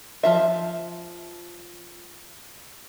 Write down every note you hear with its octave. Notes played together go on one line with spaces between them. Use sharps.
F3 F4 E5